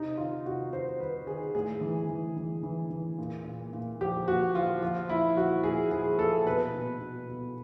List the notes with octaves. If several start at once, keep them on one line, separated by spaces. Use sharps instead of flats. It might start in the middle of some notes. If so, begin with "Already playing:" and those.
Already playing: C3 D#4
D#3 F4
C3 F#4
C3 C5
D#3 B4
D#3 G#4
A2 G#4
E3
E3
E3
E3
E3
A#2
A#2
A#2
F3 G4
A#2 F#4
F3 F4
F3 F4
A#2 E4
F3 F#4
A#2 G#4
F3 G#4
A#2 A4
B2 B4
B2
B2
B2